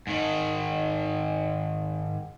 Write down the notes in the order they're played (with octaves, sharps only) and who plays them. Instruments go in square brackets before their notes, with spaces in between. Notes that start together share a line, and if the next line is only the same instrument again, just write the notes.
[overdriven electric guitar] G#2 D#3